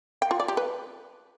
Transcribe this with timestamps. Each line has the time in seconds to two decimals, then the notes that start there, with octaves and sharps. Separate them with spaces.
0.22 G5
0.31 F4
0.40 D5
0.48 G4
0.57 B4